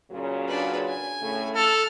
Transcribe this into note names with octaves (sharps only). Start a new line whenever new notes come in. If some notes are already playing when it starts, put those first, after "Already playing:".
A#2 C#3 F#3
D4 B4
G#5
A2 C#3 A3
A4 F6